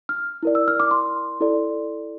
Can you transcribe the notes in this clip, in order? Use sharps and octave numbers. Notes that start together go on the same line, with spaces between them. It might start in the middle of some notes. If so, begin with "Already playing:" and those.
F6
E4 A#4 D5
E6
F6
D6
C6
E4 A4 D5